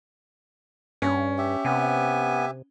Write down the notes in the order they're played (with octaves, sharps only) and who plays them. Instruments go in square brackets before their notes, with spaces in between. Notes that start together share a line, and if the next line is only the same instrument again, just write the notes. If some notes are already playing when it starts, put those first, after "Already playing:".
[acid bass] G2 [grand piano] C#4
[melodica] G4 E5
[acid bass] C3 [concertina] B3 G#5